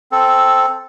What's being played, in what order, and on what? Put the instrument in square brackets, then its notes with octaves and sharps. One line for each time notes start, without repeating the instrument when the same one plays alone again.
[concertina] C4 A4